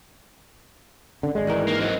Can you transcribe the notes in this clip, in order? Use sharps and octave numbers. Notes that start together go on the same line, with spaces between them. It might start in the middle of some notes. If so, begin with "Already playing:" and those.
D3 C#4
G#1 G#3 D5
D#3 E3 A#4
A#3 D#4
F#3 C4 D#5